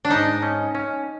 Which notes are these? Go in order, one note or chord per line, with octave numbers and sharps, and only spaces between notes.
D4
G#2 D#4
C#4
C#4